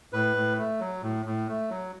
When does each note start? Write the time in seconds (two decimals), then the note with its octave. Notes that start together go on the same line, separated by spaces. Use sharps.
0.13 A2 B4
0.36 A2
0.58 A3
0.80 F#3
1.03 A2
1.25 A2
1.48 A3
1.70 F#3